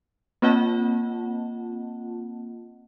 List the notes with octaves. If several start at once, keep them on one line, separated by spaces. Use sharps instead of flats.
A#3 C4 F4 D#5 F#5 A5